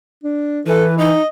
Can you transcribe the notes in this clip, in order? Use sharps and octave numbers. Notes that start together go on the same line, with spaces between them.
D4
E3 A4 B4
D#4 D#5